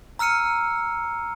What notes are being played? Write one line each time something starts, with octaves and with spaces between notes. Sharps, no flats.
A#5 E6 F6 C#7 D#7